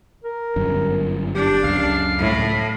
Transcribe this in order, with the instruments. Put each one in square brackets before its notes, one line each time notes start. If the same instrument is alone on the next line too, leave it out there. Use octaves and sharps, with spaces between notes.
[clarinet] A#4
[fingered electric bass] G1 F#2
[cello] D4 [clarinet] G4
[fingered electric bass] C#2 F#2 [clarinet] F5
[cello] A2